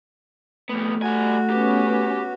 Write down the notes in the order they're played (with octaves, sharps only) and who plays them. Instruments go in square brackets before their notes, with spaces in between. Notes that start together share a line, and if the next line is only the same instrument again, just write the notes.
[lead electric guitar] F2 B3 [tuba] A3
[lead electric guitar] G3 G#5 [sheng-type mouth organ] F#4
[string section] B3 C#4 [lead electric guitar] G4